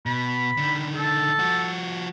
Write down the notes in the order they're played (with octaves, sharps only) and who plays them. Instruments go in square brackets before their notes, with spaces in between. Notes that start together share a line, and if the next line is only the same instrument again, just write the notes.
[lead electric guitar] B2 [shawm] B5
[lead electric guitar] D3 D#3
[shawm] A4
[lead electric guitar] F3 F#4